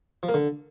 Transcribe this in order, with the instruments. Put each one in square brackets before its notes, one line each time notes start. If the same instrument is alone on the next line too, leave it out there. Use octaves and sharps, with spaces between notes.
[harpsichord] F3
A#3
D3